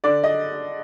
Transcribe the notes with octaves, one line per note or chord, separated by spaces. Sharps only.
D3 D5
D#5